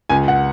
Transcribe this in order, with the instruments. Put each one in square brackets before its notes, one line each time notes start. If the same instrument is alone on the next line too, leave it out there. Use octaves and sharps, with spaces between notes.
[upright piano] C#2 G#5
F#5